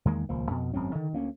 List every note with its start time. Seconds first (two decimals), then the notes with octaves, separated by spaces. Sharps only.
0.05 E2 D#3 G#3 A#3
0.29 D#1 C#2 F3 A#3
0.50 F2 B2
0.73 G#1 F#2 C4 C#4
0.94 D3 D#3
1.13 D2 A#3 C#4